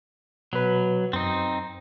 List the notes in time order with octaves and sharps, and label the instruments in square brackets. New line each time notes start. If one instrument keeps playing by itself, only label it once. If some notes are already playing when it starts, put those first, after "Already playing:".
[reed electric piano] B2 B4 [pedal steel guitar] F#3
[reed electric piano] F#2 [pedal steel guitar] C4 D#4